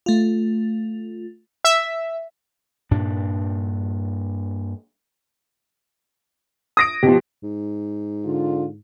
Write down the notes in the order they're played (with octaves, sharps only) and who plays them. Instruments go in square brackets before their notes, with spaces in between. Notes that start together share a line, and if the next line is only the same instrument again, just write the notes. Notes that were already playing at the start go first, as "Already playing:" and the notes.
[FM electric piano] A3 F4
[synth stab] E5
[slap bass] G2 A#2 D4
[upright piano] D#6 A#6 D7
[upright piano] B2 F3 [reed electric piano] G4
[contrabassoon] G#2
[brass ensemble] D3 F4